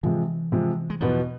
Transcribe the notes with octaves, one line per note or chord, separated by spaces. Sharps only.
C3 E3 F3 G#3
C3 F3 G#3
G#3
E2 B2 F3 B3